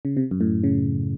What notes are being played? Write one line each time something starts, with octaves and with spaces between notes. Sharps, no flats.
C#3
C3
F#2
A2
C#3